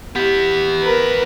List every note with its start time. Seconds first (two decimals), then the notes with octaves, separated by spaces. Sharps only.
0.16 B3 E4 G4
0.83 A#4 B4